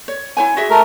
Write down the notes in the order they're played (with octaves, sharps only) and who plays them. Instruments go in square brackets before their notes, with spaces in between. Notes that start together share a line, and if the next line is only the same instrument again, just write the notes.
[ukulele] C#5
E4 C#5 G#5
F#4 G#4 E5
[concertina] A3 A#4